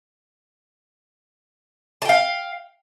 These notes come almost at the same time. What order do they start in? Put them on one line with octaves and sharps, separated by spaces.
A5 G5 F5